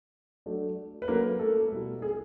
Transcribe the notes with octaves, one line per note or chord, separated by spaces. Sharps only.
F#3 A3 D4
B4
F#3 A3 A#3 C#4 E4 A#4
A3 A4
B2 G3 B3 E4
G#4